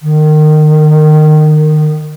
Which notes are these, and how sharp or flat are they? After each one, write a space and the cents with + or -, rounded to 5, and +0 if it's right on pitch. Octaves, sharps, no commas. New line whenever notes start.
D#3 -25